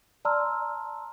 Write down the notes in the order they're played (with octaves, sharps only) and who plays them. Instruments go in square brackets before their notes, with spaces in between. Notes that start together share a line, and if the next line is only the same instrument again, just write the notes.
[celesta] D5 A5 A#5 C6 E6 F6